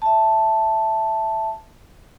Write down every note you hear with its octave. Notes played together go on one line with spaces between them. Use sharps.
E5 A5